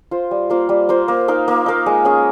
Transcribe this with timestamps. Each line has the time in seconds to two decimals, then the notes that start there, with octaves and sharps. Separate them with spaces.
0.11 F4 C5
0.31 G3
0.50 A#3 F4 C5
0.69 G3
0.89 A#3 F4 C5
1.08 A#3
1.28 D#4 A#4 F5
1.48 A#3
1.66 D#4 A#4 F5
1.86 G#3
2.05 C#4 G#4